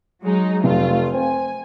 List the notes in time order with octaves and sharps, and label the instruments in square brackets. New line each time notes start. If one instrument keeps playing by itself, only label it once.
[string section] F#3 G#3 D#4
[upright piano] F1 [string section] A3 F4
[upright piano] C4 [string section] G#5